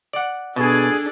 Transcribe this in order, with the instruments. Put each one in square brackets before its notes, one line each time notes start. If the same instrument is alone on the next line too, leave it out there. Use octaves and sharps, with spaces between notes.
[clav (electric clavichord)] D5 F#5
[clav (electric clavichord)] B2 [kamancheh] D4 A4 [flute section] G#4